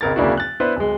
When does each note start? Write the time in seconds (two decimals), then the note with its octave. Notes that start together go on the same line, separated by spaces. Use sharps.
0.01 G#1 C#2 A#4 G#6 A6
0.16 D1 C#3 A#3 D4 E4 F#4
0.37 F#6 A6
0.60 B3 D4 E4 B4 C5
0.76 D1 G#3